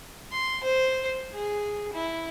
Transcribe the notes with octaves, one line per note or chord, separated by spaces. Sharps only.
C6
C5
G#4
E4